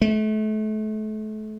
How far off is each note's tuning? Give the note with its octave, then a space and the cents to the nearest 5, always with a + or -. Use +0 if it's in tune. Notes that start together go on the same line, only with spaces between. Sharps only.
A3 -35